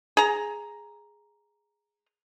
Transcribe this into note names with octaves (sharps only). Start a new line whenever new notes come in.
G#4 A#5